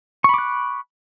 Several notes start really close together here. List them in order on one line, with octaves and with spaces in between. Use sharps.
C#6 B5 D6 F#6